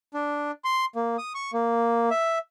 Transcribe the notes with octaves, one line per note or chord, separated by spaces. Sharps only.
D4
C6
A#3
D#6
C#6
A#3
E5